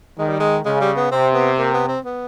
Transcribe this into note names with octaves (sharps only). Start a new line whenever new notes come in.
D#3 G#3
G3
G#3
C#3 G#3
G3
B3
C3 C4
B3
A#3
B3
C4
B3